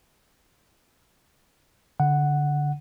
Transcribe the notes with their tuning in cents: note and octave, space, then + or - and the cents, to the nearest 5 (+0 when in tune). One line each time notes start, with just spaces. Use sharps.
D3 -20 F#5 +0